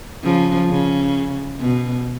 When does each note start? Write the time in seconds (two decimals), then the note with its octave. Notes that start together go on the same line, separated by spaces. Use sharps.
0.24 C#3 F3
0.70 C#3
1.60 B2